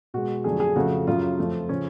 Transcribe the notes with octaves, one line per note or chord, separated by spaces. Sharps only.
B2 G#3 F#4
F2 D3 F#3 A3 G#4
G#4
F2 C#3 F3 A3 F#4
F#2 C#3 F#3 F4
F2 F3 A3
C#3 F3 C#4